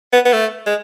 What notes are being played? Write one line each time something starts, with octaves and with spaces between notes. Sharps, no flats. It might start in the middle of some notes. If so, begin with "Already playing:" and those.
B3
B3
A3
G#3